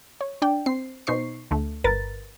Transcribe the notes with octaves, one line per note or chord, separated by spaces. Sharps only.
C#5
D4 D5 G5
C4 C5 C7
B2 D#4 C5 C#6 C7
D2 D3 A3
G1 A#4 B4 A6